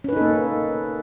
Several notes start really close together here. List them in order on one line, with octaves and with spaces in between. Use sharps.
C#4 B4 D#4 A4 A#3